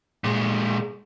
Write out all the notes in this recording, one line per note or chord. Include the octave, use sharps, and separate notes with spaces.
A#2 G#3